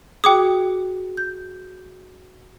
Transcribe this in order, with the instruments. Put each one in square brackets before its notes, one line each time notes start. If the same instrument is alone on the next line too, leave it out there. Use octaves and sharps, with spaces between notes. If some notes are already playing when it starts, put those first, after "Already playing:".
[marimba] F#4 G#4 [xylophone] G5 D6 D#6
[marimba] G6